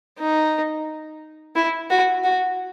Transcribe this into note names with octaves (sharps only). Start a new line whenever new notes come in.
D#4
E4
F#4
F#4